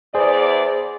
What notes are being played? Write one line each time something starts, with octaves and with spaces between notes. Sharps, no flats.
E2 G#4 C5 D5